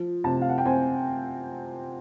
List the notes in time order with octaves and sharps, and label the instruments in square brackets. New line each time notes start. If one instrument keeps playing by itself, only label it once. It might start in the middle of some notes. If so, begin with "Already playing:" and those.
Already playing: [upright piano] F3
C3 A5
F5
F#5
G5
C4 G#5